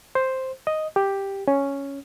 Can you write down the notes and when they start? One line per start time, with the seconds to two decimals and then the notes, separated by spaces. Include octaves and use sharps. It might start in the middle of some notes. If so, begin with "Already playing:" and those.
0.15 C5
0.67 D#5
0.96 G4
1.48 C#4